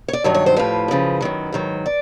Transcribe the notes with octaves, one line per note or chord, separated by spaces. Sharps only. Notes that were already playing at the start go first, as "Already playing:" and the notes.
C#5
D5
G2 D#3 F#3 C#5
C#5
C5
A2 F3 B4
F#2 C#3 F3
F#2 D#3 F#3
G#2 D#3 F#3
D5